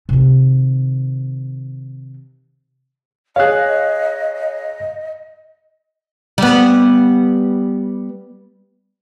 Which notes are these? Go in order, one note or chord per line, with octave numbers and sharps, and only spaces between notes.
C3 D#3
G#4 C#5 D#5 F5 F#6
G3 B3